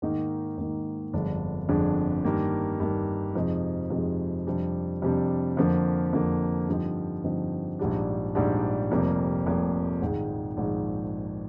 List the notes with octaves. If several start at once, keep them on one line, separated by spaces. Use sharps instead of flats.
G#2 D#3 A#3 D#4
G#2 D#3 A#3 D#4
G1 F2 D3 G#3 D4
G1 F2 D3 G#3 D4
G2 D#3 A#3
G2 D#3 A#3
F2 C3 F3 G#3 D#4
F2 C3 F3 G#3 D#4
F2 C3 G3 D4
F2 C3 G3 D4
F2 D3 F3 A#3
F2 D3 F3 A#3
G2 D3 F3 C4 D#4
G2 D3 F3 C4 D#4
A#1 G#2 G3 D4
A#1 G#2 G3 D4
F1 F2 C3 G3 A#3
F1 F2 C3 G3 A#3
A#1 G#2 D#3 G#3
A#1 G#2 D#3 G#3